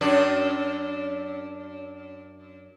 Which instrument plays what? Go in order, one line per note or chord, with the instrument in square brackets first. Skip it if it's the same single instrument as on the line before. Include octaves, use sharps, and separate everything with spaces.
[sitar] F#2 D4